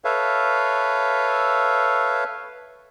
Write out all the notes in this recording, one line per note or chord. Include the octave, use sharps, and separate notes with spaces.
A4 B4 C#5 E5 F5